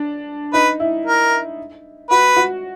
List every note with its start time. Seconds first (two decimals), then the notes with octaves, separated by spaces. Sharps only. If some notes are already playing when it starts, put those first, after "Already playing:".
Already playing: D4
0.53 D#4 B4
0.80 E4
1.05 A#4
2.10 F#4 B4
2.36 F#4